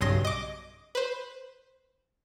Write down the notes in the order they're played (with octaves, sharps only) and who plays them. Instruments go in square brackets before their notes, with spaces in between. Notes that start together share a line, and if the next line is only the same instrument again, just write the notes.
[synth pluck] B1 G2 C#3 C6 D#6 A#6
D#5 D6
B4 C5